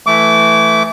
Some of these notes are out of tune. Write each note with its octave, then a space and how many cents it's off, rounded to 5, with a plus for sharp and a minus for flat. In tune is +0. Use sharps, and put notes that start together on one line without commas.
E3 +0 A3 +0 D6 -25